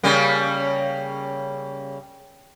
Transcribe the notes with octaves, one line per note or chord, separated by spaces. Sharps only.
C#3 G3 A#3